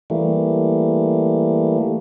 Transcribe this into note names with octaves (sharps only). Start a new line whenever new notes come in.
E3 G3 A3 A#3